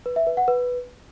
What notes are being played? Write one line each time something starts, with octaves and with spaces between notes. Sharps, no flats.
B4
E5
B4
F#5
B4